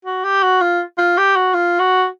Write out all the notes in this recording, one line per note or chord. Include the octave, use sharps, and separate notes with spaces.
F#4
G4
F#4
F4
F4
G4
F#4
F4
F#4